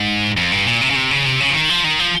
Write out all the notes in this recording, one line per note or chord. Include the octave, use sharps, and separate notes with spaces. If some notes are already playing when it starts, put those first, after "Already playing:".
Already playing: G#2
F2
G2
A#2
C3
C#3
C3
C#3
C3
C#3
F3
D#3
F3
D#3
F3